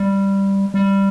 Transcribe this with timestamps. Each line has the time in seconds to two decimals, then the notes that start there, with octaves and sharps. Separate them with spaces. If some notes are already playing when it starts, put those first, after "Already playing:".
Already playing: G3
0.74 G3